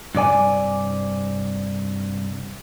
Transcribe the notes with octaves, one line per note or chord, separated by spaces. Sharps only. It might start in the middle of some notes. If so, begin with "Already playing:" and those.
G2 C3 D5 G#5